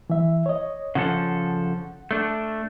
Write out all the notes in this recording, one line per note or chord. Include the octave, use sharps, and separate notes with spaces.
E3 E5
C#5 D#5
C#3 F3 A4 F#5
A3 D4